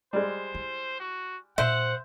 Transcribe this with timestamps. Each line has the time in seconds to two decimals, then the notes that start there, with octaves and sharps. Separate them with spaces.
0.13 G3 G#3 C5
0.54 E4
1.00 F#4
1.58 A#2 C5 E5 F#5